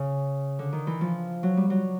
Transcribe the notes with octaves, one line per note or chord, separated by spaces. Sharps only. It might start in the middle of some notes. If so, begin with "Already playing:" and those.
Already playing: C#3
D3
D#3
E3
F3
F#3
G3
F#3